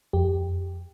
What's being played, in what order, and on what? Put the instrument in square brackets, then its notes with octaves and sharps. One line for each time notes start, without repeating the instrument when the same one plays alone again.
[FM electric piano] F2 G4